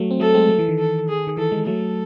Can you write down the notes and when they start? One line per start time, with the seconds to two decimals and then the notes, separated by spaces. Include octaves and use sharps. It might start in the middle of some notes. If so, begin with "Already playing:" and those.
Already playing: F#3 A3
0.10 C4
0.20 F#3 A3 A4
0.34 G#3 C4
0.49 F#3 A3
0.59 E3
0.69 D#3
0.78 A4
1.09 G#4
1.27 D#3
1.37 E3 A4
1.52 E3 G#3
1.66 F#3 A3 A4